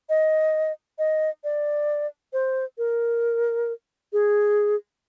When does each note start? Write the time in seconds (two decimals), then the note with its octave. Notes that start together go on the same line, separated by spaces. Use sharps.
0.09 D#5
0.99 D#5
1.44 D5
2.33 C5
2.78 A#4
4.13 G#4